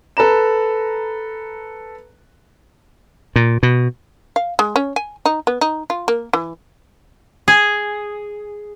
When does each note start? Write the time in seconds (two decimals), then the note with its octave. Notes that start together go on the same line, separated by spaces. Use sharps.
0.17 A4 B4 A#5 E7
3.36 A#2
3.63 B2
4.36 F5
4.59 G#3
4.76 C#4
4.96 G#5
5.26 D#4
5.47 B3
5.61 D#4
5.90 F4
6.08 A#3
6.33 E3
7.48 G#4